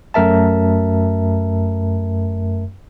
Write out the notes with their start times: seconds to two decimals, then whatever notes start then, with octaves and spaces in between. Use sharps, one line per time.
0.14 F#2 A3 A#4 E5 A5